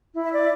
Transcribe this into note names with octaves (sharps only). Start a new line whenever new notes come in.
E4
E5
D5